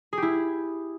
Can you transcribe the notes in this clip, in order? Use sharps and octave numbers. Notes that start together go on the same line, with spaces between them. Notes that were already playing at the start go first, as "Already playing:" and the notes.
E4 G4 G#4